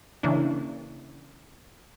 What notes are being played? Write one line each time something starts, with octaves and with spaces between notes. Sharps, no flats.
C#3 E3 A#3 D4